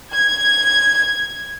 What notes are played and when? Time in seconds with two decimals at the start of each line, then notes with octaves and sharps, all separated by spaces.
0.13 G#6